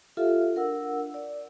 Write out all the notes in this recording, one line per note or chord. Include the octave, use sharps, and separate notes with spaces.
F4 G4 A4 E5 F5
D4 A#4 F#5 E6
D5